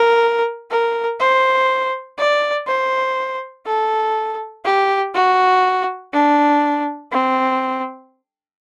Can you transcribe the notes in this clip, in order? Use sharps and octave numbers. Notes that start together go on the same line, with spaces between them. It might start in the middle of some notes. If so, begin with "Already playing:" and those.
Already playing: A#4
A#4
C5
D5
C5
A4
G4
F#4
D4
C4